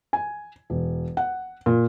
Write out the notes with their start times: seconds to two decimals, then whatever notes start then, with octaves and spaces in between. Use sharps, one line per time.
0.13 G#5
0.70 E1
1.17 F#5
1.66 A#2